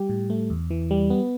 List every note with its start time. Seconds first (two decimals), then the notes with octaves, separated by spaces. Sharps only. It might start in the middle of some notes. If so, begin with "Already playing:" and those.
Already playing: G3 G4
0.09 A2
0.30 A3
0.50 E2
0.71 E3
0.91 G3
1.10 B3